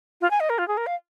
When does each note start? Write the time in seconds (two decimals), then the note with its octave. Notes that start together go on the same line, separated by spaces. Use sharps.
0.21 F4
0.31 G#5
0.40 D#5
0.50 A#4
0.58 F4
0.68 G#4
0.77 A#4
0.87 F5